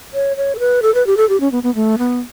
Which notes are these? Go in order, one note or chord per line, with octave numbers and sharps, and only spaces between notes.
C#5
C#5
A4
B4
A4
B4
G4
A4
G4
C#4
B3
B3
A3
B3